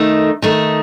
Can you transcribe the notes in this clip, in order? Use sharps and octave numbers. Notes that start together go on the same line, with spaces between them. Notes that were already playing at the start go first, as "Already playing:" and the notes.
Already playing: D#3 A3 D#4
D#3 A3 D#4